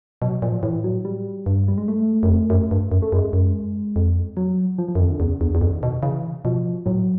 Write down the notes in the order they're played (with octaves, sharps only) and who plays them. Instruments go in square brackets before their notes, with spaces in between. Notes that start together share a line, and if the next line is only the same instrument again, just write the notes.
[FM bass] B2 [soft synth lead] F#3
[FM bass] A#2 [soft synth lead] F3
[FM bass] A2 [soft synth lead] E3
[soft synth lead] F#3
G3
[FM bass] G2
[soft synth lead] G3
G#3
A3
[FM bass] F#2
F2
F#2
G2
F#2
[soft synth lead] A3
[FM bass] F#2 [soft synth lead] G#3
[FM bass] F#2
F2
[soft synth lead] F#3
F3
F3
[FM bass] F#2
[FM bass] F2 [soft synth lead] D#3
[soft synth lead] D3
[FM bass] E2 [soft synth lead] C#3
[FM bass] E2 [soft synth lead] D3
[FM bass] E2
[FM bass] F2 [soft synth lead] D#3
[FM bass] B2
[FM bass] C#3 [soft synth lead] E3
[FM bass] B2 [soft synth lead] F3
[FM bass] A2 [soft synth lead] F#3